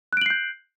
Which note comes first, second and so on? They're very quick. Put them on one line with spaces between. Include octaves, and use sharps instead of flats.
F#6 D7 F#7 C7 G6